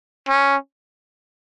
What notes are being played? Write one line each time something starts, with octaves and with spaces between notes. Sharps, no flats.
C#4